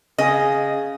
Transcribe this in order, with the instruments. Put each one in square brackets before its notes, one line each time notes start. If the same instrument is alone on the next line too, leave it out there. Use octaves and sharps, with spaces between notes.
[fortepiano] C#3 [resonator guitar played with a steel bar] D#5 [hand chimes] F5 G#5